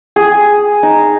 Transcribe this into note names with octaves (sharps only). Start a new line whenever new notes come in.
G#4
D#4